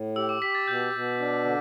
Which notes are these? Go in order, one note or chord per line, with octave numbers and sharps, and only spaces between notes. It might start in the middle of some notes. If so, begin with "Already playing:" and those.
Already playing: A2
G4 E6
D6
G4 B6
A6
B2 G6
B2
D4
D3